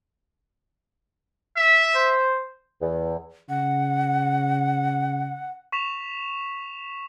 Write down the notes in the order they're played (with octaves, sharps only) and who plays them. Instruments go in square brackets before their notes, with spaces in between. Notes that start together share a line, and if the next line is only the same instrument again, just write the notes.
[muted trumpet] E5
[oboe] C5
[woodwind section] E2
[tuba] C#3 [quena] F#5
[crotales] C#6 B6 E7 F7